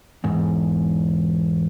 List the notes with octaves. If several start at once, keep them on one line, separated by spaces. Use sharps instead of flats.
E2 G#2